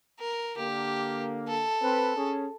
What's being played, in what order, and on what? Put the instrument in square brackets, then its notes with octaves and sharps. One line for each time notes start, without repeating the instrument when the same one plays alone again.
[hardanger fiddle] A#4
[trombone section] D3 A#3 [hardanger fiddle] G4
[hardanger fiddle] A4
[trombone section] C4 B4
C#4 G#4